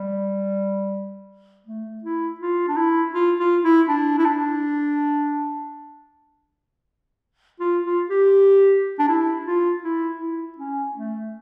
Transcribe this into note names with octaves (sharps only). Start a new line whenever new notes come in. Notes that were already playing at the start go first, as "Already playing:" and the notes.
Already playing: G3
A3
E4
F4
D4
E4
F4
F4
E4
D4
E4
D4
F4
F4
G4
D4
E4
F4
E4
E4
C#4
A3